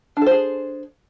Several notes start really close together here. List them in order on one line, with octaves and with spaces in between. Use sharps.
D4 A4 C5 G#4